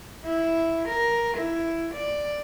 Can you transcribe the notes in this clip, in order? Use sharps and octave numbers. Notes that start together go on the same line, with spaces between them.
E4
A#4
E4
D5